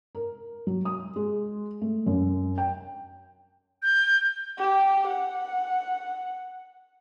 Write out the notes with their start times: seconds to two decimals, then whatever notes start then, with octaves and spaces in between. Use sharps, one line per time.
0.15 A#4
0.67 F#3
0.85 D#6
1.16 G#3
1.81 A3
2.06 F#2
2.58 G5
3.82 G6
4.58 G4
5.08 F#5